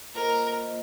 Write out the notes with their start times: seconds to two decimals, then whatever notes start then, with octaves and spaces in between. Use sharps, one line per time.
0.14 A#3 F4 A#4 C5 D#5
0.63 A#3 F4 C5 D#5